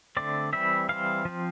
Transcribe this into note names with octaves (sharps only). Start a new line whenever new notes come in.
D3 A3 C4 D5
E3 G3 C4 E5
E3 G3 C4 F5
F3 C4